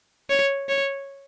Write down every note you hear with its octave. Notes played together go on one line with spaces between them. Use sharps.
C#5
C#5